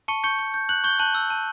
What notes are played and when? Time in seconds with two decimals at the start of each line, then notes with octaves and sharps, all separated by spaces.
0.08 A5 C#6 C#7
0.24 C#6 G6 C#7
0.39 C#6
0.54 G6
0.69 F#6 G6 F#7
0.84 C#6 G6 G7
0.99 A5 F#6 F#7
1.15 E6
1.30 A5